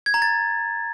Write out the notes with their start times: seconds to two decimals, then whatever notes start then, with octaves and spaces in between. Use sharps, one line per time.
0.06 G#6
0.14 A#5
0.22 A6